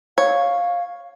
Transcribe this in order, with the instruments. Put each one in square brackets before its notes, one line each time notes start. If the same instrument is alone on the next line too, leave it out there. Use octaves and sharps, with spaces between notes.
[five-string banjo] C#5 [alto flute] F5